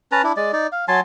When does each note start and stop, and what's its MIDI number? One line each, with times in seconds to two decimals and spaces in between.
0.12 0.22 61
0.12 0.22 71
0.12 0.22 81
0.12 0.22 82
0.24 0.32 62
0.24 0.32 64
0.37 0.52 56
0.37 0.52 74
0.53 0.67 63
0.53 0.67 74
0.72 0.85 77
0.88 1.00 54
0.88 1.00 80
0.88 1.00 81
0.88 1.00 84